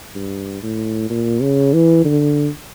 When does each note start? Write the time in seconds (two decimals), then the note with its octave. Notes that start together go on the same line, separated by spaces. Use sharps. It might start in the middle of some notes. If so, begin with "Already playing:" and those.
0.15 G2
0.63 A2
1.10 A#2
1.42 C#3
1.73 E3
2.05 D3